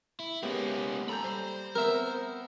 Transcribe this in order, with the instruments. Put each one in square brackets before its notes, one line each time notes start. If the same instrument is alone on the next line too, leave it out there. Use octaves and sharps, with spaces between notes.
[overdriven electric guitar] E4
[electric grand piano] G#3 B3 G4 [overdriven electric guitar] A#3 C#4
[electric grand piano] A4 G6 [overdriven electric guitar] A#5 B5
[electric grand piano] G3 [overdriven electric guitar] C5
[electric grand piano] B3 C4 [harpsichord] A#4 E5